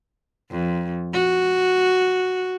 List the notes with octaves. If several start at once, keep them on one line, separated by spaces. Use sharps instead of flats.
F2
F#4